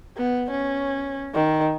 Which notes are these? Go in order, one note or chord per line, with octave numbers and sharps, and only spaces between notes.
B3
C#4
D#3